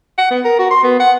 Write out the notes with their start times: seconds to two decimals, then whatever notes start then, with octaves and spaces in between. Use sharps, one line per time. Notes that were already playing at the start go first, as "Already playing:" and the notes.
0.18 F#5
0.31 B3
0.44 A#4
0.59 F#4
0.70 C6
0.83 B3
1.00 F#5